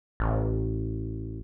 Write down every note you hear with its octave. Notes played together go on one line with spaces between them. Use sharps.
A1